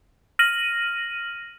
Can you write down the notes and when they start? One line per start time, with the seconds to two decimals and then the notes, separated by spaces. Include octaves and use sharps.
0.39 F6 A#6 D#7 F#7